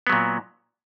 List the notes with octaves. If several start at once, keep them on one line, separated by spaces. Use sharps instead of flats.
A#2 F#3 B3